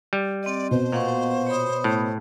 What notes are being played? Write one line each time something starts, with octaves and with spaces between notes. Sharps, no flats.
G3
C4 D5 D#5
B2 C5
A#2 F5 F#5 C#6
C#5 B5 D#6
A2